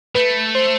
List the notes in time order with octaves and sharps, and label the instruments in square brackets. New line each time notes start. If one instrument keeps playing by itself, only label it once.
[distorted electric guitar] A3 [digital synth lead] B4
[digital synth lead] C5